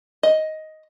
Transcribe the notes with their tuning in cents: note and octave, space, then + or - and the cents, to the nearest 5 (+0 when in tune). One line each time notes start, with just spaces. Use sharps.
D#5 +10